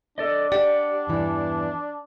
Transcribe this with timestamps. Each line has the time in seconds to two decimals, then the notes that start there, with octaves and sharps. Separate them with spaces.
0.18 D4 A4 D5 D#5
0.52 G4 D5 F#5
1.07 E2 G2 E3